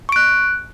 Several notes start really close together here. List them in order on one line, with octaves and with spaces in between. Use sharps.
C#6 D7 F#6